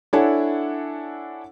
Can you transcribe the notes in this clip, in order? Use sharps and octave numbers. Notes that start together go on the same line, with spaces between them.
D4 E4 A4 C#5 F#5 G#5